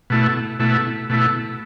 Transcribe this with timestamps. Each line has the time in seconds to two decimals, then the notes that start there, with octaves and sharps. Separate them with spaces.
0.10 B2 A3 E4
0.59 B2 A3 E4
1.10 B2 A3 E4